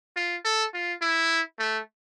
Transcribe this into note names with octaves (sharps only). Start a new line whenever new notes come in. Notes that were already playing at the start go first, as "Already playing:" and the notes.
F4
A4
F4
E4
A3